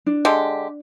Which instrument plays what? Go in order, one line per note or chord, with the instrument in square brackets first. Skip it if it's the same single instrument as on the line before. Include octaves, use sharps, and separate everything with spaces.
[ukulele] D4
[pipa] D3 G#3 G4